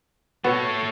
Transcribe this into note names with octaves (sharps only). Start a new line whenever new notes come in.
B2 A3 B3 F#4 C#5